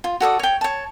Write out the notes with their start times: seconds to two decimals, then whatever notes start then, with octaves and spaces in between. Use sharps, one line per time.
0.04 F4
0.20 F#4 A4 D5 D#6
0.39 C#5 G5
0.61 C#5 A5